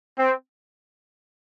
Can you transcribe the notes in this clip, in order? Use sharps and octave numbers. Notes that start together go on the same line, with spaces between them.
C4